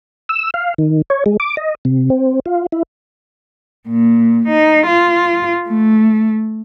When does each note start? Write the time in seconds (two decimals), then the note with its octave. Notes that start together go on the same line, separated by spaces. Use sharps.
0.29 E6
0.54 F5
0.78 D#3
1.10 C#5
1.26 G#3
1.40 D6
1.57 D#5
1.85 C3
2.10 C4
2.46 F4
2.72 E4
3.88 A#2
4.48 D#4
4.87 F4
5.69 A3